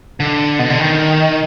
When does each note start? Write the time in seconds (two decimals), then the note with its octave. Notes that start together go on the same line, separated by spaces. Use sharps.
0.20 D3
0.59 B2
0.70 D3
0.80 D#3